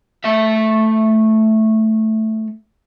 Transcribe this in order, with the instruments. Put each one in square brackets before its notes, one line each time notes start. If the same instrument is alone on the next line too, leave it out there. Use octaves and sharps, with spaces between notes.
[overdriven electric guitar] A3 E5